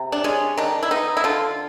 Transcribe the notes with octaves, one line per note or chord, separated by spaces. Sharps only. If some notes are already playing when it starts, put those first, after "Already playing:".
Already playing: C3
D4
G#3 C#4
D#3 D4
E4
B3 D#4
E4
D3 F4